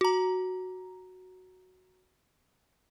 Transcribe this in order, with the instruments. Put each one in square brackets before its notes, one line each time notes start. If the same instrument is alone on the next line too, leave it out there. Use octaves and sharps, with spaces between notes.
[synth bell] F#4 A#5